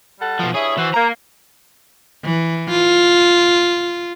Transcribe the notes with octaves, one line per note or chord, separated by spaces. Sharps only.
G3 A4 F#5
B2 F3
G2 E4 G#4 C#5
E3 E4 F#4 C5
A#3 A#5
E3
F4